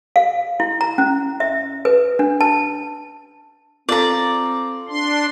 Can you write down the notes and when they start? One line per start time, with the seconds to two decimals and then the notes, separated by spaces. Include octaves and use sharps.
0.16 F5
0.60 E4
0.81 A#5
0.98 C#4
1.40 E5
1.85 B4
2.19 D4
2.41 A5
3.89 C4 F4 A4 D5 A#5
4.89 D4 C6